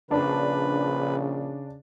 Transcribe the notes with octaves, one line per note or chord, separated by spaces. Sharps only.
A#1 C#3 D4 B4